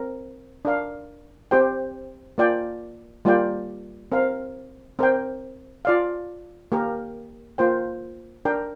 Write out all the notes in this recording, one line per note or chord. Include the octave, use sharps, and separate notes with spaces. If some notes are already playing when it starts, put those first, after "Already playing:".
Already playing: C4 A#4
D4 A#4 F5
C4 G4 C5 G5
A#3 F4 D5 G5
G3 A#3 F4 D5 G5
C4 A#4 F5
C4 A#4 G5
F4 D5 F5
A#3 G4 A#4
A#3 F4 C5 G5
D4 A#4 G5